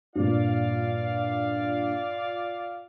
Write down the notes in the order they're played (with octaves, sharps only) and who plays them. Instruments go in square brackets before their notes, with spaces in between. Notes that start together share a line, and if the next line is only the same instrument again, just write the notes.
[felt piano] G2 A#2 [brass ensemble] F4 D5 F5